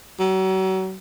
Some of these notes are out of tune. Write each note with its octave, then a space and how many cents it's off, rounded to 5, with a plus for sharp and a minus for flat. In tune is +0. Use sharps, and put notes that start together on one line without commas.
F#3 +35